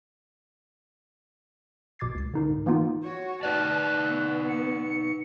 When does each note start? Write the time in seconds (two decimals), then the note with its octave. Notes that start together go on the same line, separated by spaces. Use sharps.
1.99 B1 B2 D6 G#6 A6 C7
2.15 C#2 C7
2.34 D3 D#4 A#4
2.49 G#2
2.66 E3 A#3 B3 D#4 F4
3.03 F#4 C#5
3.43 D#4 B4 D5 A5 F#6
4.07 B3
4.48 C#7